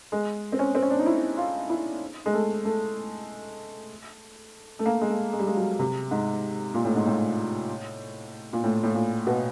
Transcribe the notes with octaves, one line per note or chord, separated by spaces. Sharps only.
G#3
C4
C#4
C4
C#4
D4
D#4
E4
F4
E4
G#3
A3
A3
A3
A#3
G#3
A3
G#3
G3
G#3
F#3
C3
G#2
A#2
A2
G#2
A2
A#2
A2
A2
A#2
B2